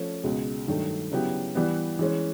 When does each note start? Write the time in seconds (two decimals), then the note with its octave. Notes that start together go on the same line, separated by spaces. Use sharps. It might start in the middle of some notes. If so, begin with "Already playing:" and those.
Already playing: F3 A3 C#4
0.24 C#2 B2 G#3
0.67 G2 D#3 F#3 A3
1.11 C#3 F#3 B3 E4 G4
1.55 E3 G3 B3
1.99 E3 G#3 C#4